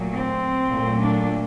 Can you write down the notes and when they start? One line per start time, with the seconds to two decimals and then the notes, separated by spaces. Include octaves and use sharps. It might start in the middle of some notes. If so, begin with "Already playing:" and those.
Already playing: A#2 F#3 A3
0.10 C4
0.69 A#2 F#3 A3
0.99 D4